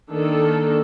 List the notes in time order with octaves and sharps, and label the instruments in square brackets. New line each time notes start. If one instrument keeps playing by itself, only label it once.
[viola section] D#3 A#3 D4 A4